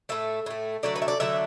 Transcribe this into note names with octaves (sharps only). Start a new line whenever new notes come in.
A2 A3 E5
A2 A3
D3 F#3 A3 D5
B4
E5
D5
D3 F#3 A3 E5